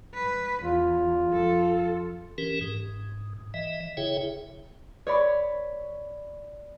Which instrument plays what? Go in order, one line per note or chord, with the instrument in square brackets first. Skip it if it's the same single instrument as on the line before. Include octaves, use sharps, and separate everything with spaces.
[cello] B4
[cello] E2 [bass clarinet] F4
[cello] F2 A4
[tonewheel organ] E3 C#4 G4 A#4
G#2
E3 D#5 E5
C#3 E4 G#4 C#5 E5 G5
[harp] C#5 D5 B5